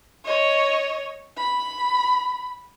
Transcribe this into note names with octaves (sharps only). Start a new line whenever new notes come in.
C#5 D#5
B5